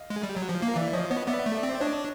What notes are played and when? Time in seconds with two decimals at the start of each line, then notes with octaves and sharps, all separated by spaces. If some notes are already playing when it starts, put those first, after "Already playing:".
Already playing: D#5 F5
0.10 G#3
0.23 G3
0.36 F#3
0.49 F3
0.62 A#3 F5
0.76 E3 D5 E5
0.93 F3 C#5 D#5
1.10 B3 C#5 D#5
1.28 B3 D5 E5
1.46 A3
1.54 D5 E5
1.63 C4
1.71 D5
1.80 D4 C#5 D#5